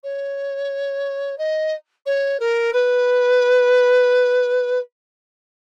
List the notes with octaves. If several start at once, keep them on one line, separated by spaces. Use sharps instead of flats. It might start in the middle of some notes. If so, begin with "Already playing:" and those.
C#5
D#5
C#5
A#4
B4